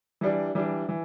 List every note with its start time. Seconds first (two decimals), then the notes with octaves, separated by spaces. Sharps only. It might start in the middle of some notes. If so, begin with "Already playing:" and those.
0.21 E3 G3 D4
0.55 E3 G3 D4
0.89 E3